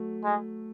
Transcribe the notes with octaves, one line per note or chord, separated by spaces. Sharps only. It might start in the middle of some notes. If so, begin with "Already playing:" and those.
Already playing: F#3 A3
G#3